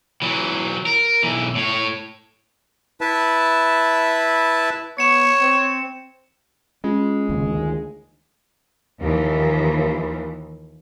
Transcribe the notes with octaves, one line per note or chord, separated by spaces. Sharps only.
E3 F#3
A#4
B1 E3
A2 C#5
E4 B4 E5 A5
B3 C#5 C#7 E7
C4
G#3 C#4 F4
F1 D#2 C#3
D2 D#3
D#2 E3 F3